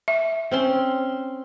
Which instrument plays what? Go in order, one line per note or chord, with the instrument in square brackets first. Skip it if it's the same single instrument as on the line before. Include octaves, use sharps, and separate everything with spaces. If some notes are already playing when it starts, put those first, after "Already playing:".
[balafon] E5
[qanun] C4 C#4 C6